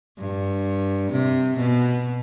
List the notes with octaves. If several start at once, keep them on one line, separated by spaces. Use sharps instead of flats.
G2
C3
B2